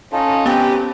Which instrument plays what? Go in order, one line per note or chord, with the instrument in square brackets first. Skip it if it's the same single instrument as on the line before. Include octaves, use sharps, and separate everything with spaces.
[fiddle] C#4 [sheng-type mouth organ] D#4 F4 A4
[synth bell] B3 [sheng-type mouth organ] C4 B4 A#5 [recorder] G4